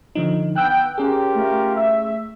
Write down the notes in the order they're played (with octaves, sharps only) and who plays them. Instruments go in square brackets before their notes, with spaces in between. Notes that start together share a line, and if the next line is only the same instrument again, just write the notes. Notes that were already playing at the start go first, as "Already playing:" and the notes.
[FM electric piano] D3 F3 D#4
[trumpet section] B3 G5 [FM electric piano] E6 F#6
[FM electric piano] C#4 G#4 [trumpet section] F4 G4 A#4
[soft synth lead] A3
[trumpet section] E5